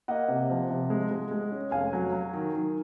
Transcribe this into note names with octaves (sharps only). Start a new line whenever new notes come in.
A#3 D#5 F#5
C3
F3
C3
G#3
G#3
G#3
C#4
F1 F5 G#5
F#3
F#3
D#3
D#3